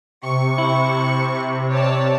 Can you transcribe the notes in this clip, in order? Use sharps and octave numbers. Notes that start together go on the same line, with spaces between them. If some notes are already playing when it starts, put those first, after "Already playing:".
C3 C#6
E4
C#5 D5 A5